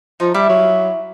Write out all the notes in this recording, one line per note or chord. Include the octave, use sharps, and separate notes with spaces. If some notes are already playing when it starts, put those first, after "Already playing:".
F3 D#4
G3 E4
F#3